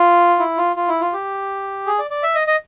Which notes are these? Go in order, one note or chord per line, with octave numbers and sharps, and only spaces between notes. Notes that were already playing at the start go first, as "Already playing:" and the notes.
Already playing: F4
E4
F4
F4
E4
F4
G4
G#4
D5
D5
E5
D#5
D#5